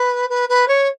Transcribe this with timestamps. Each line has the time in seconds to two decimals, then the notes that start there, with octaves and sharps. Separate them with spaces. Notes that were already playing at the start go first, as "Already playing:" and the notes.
Already playing: B4
0.30 B4
0.49 B4
0.68 C#5